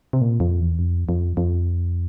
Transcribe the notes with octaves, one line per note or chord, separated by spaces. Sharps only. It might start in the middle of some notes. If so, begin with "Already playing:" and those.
C3
A#2
F2
E2
F2
F2
F2